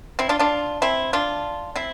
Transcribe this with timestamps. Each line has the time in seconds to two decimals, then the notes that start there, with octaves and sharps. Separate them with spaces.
0.19 C4 E4
0.29 D4 F4
0.39 D4 F4
0.82 C4 E4
1.13 D4 F4
1.75 C4 E4